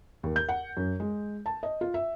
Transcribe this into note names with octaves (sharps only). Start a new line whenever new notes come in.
D#2
G6
F#5
F#2
G#3
A5
D#5
F4
E5